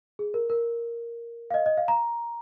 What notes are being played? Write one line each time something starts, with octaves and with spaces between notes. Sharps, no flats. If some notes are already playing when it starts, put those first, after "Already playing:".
G#4
A#4
A#4
F5
D#5
D#5
F5
A#5